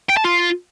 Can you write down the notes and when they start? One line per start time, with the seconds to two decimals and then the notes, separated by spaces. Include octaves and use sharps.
0.10 G5
0.17 A5
0.25 F4